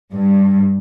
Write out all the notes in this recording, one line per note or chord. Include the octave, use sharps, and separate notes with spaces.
G2